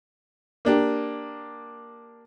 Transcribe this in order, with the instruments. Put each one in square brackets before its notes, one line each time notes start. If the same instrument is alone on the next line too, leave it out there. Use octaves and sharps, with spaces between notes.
[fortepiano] A#3 D4 G4